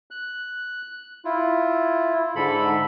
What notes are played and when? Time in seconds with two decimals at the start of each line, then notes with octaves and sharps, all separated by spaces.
0.11 F#6
1.25 E4 F4
2.35 G#2 D3 A4 B5